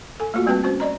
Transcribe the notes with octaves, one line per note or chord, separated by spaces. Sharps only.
A4 G#5
A3 A#3 F4 F#4
G3 C4 F#4 B4 G5 A5
C#4 F#4 C5
D5 D#5 A#5